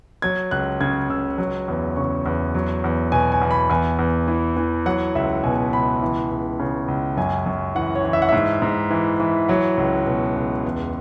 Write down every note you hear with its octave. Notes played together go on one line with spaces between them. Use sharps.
F#3 G#6
C#2 F#6
C#3 G#6
C#2 E6
F#3
E2
C#3 C#6
E2
F#3
E2
B2 G#5
G#5
E2
B5
E2 G#5
E2
E3
E3
F#3 F#5
C#2 E5
B2 G#5
C#2 B5
E3
C#2
C#3
C#2
F#2 G#5
F#2
E3 F#5
C#5
E3
E5
F#5
G#2 E5
G#2
E3
E3
F#3 F#5
C#2
B2
C#2
E2